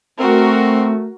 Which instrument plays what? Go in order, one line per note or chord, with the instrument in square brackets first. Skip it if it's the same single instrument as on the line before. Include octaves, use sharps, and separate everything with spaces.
[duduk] A3 [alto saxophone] C4 [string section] F#4 A#4